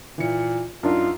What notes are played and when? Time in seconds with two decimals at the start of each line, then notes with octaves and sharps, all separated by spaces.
0.18 A#2 E3 C#7
0.83 F#2 D4 D#4 F4